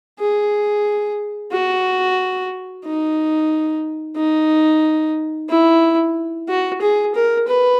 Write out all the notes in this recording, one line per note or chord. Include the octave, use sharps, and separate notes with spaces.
G#4
F#4
D#4
D#4
E4
F#4
G#4
A#4
B4